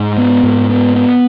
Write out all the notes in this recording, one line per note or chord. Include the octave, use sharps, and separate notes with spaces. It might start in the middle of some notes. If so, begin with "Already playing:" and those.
Already playing: G#2
B3
G#2
B3
B3